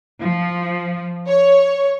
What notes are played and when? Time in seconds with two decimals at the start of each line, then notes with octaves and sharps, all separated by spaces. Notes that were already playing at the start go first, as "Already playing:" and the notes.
0.24 F3
1.28 C#5